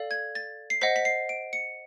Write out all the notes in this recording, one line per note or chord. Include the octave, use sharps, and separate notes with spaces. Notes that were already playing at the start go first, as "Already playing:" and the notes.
Already playing: A4 D5 F5
G#6
A6
C7
C5 D#5 F#5 B6
B6
C7
D7
C#7